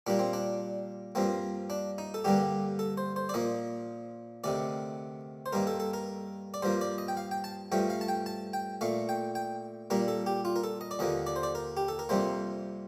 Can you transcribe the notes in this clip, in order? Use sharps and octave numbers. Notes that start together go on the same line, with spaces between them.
A#2 G3 A#3 D4
C4
D4
G2 F3 A#3 C4
D4
D#4
A4
G2 D3 G3 A#3 G4
A4
C5
C5
D5
A#2 F3 A#3 D#5
D2 C3 D#3 D5
C5
G2 D#3 A#3 A#4
A4
A4
A#4
D5
G2 F3 A#3 C5
D5
D#5
G5
F5
G5
A5
G2 F3 A3 G5
F5
A5
G5
A5
G5
A#2 A3 F5
G5
G5
A#2 G3 A#3 A#4
A4
G4
F4
A#4
A4
D#5
D5
D#2 D3 F3 A#3 D#5
D5
C5
D5
A#4
G4
A4
A#4
F2 C3 G3 A#3 C5